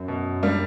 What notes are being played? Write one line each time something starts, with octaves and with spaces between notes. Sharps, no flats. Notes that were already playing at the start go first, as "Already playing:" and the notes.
Already playing: F#2
B2
G3 A#3 D4